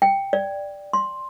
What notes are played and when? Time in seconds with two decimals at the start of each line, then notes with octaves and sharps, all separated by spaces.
0.02 G5
0.33 D5
0.93 C6